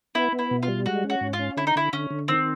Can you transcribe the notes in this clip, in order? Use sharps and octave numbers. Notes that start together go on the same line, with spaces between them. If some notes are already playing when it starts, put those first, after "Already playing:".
B3 E4
B3
E4
B2
F4
G3
G#3 F#4
C#4
F#4
G#2
F4
C#4
D3 E4
D#4
D3 E4
D3 C#4
D3
D#3 C4